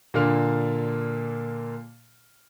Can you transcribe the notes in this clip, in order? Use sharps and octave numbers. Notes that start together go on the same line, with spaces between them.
A#2 D3 A#3 F6